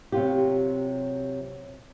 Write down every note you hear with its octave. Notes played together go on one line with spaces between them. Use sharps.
C3 F#3 F4 G4